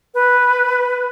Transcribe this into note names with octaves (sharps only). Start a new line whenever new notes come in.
B4